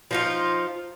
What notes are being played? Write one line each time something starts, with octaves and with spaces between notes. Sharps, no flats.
F3 D#4 F4